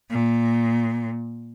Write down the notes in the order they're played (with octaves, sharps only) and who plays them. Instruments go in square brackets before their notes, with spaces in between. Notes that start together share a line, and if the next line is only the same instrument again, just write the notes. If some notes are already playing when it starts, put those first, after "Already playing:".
[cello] A#2